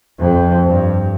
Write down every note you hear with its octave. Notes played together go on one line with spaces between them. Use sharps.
F2
G2